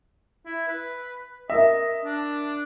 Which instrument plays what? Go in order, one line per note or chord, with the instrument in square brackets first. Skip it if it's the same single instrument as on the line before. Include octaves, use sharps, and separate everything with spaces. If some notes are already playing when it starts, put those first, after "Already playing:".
[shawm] E4
B4
[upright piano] A#4 E5 [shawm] D#5
[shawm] D4